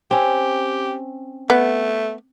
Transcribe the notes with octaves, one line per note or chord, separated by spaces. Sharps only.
C4 C#4 G4
A3 B3